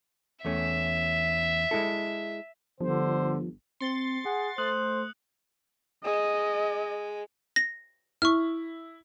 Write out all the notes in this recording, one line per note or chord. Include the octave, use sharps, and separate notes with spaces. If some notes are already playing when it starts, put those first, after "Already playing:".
E2 A3 C#4 E5
G#3 E4 A4
G1 D3 F3 C5
C4 C6 A6 C#7
G#4 F#5
A3 C5 D#6 F#6 F#7
G#3 D#5
A#6
E4 C#6 F6